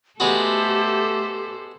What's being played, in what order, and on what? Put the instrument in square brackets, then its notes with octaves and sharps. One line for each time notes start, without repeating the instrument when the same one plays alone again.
[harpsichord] G#3 B3 F#4 [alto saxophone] A3 [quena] G4 [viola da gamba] A4 C5